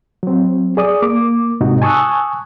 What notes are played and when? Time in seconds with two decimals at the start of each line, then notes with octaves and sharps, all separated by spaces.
0.23 F#3 C4
0.77 G#4 D5 D#6
1.02 A#3 D6
1.61 G#2 C3 D#4 F#4
1.82 G#5 A5 C#6 D#6 E6 F#6